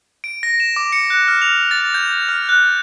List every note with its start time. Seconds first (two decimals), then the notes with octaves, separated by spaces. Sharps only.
0.24 D7
0.43 A#6
0.60 E7
0.76 D6
0.93 C#7
1.10 F#6
1.28 F6
1.42 F7
1.71 A6
1.94 G6
2.29 F6
2.49 F#6